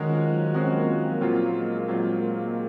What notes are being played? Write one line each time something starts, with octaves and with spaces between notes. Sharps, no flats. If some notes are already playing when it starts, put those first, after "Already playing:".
Already playing: D#3 G#3 C#4 F#4 A#4
F3
F#3
G#3 C4 C#4 F#4 A#4
A#3
A#3
A#2 F#3 A#3 C4 F4
G#3
A#2 F#3 C4 F4